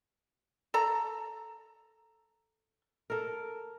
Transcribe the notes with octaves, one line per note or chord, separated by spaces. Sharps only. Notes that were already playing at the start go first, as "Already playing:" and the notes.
A4 A#5
A4 A#4